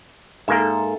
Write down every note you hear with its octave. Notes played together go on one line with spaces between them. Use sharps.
G#2 A#3 A4 A#4 E5